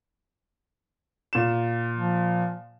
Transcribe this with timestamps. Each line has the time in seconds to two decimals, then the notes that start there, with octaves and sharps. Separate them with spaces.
1.33 A#2 E7
1.96 F3